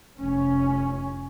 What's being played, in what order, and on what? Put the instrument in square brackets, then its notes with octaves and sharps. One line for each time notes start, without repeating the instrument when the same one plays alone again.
[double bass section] F1 C#4